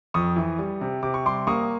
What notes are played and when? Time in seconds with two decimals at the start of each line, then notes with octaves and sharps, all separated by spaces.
0.14 F2 C#6 D#6
0.36 E3
0.59 G3
0.81 C3
1.03 C3 D6
1.14 C#6
1.25 G3 C6 D6
1.47 A#3 C#6 D#6